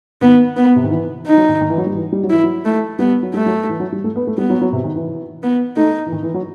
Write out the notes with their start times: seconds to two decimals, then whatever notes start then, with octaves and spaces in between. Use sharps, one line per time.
0.22 D#3 B3
0.57 B3
0.76 C3
0.84 D#3
0.91 E3
1.26 D#4
1.38 F#3
1.49 D#3
1.61 D#3
1.70 E3
1.78 F#3
1.87 G3
1.95 E3
2.12 G3
2.23 F#3
2.30 E3 E4
2.44 F#3
2.65 A3
2.99 G3 B3
3.23 F#3
3.34 G3 A3
3.46 F#3
3.69 E3
3.80 F#3
3.92 G3
4.04 A3
4.16 B3
4.27 A3
4.38 G3 B3
4.50 F#3
4.61 F#3
4.73 C3
4.84 D#3
4.96 E3
5.43 B3
5.76 A3 D#4
6.06 E3
6.12 D#3
6.23 E3
6.34 F#3